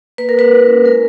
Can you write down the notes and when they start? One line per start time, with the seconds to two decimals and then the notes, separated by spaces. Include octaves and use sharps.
0.18 A#3 B4
0.29 A#4
0.35 A#3 B4
0.52 E4
0.68 C#4
0.85 G#3 A#4